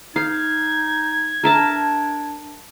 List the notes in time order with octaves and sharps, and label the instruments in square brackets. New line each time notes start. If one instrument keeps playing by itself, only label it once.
[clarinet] D#4 [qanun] F5 [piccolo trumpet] G#6
[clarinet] D4 [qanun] A#4 E5 A5